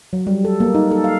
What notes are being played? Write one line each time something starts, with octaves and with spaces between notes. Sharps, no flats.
F#3
G3
A4
A#3
D#4
A4
F5